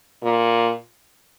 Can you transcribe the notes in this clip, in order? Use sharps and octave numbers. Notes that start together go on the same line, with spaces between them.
A#2